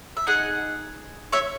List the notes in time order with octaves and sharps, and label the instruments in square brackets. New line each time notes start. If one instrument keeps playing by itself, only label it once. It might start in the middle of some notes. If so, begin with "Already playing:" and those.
[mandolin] E5
D#4 G#4 D#5 F#5
C#5 E5